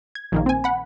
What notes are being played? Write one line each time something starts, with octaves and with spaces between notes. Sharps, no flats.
G#6
A#1 D#3 A#3
C4 G#5
F#5 B5